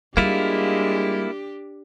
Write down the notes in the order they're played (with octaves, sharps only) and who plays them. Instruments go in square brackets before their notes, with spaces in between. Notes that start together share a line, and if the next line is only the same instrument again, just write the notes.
[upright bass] G3 [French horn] G#3 [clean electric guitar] A#3 E4 F4 [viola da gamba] D4 G4